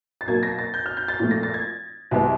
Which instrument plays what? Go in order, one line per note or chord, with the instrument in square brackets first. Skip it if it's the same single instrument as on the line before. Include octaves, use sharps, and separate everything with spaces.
[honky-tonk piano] A6
B2 F#3 A#3 G#6
A#6
A6
G6
F6
G6
A6
A#2 F3 A3 A6
A#6
A6
G#6
C2 C3 E3 G#3 B3